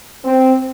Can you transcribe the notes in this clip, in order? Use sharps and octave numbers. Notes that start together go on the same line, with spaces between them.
C4